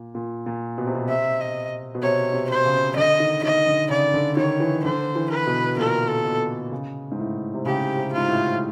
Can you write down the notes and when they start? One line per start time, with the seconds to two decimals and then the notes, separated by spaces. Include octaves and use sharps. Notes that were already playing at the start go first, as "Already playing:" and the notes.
Already playing: A#2
0.15 A#2
0.46 A#2
0.78 B2
0.86 C3
0.95 B2
1.08 C3 E5
1.41 D#5
1.95 B2
2.02 C3 C#5
2.34 C3
2.49 C5
2.65 C#3
2.96 D3 D#5
3.20 D#3
3.43 D#3 D#5
3.67 D3
3.90 C#3 D5
4.14 D3
4.37 D#3 C#5
4.60 E3
4.84 D3 C5
5.15 E3
5.30 B4
5.47 B2
5.78 A#2 A#4
6.09 A4
6.25 B2
6.72 C#3
7.11 G#2
7.19 A2
7.54 C3
7.65 C#3 G4
7.97 C3
8.12 G#2 F4
8.28 A2